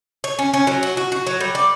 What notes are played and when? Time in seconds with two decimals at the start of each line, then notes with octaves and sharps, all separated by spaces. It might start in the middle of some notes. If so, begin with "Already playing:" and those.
0.24 C#5
0.39 C#4
0.54 C#4
0.67 F#3
0.83 F#4
0.97 F#4
1.12 F#4
1.27 F#3
1.40 G3
1.55 D5